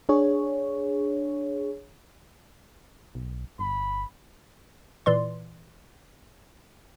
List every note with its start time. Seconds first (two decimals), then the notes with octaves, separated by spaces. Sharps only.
0.09 D4 G#4 C#5
3.15 B1
3.59 G1 B5
5.06 A#2 E3 D5 C6